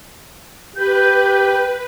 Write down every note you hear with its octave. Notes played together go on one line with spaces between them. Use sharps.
G4 B4 G6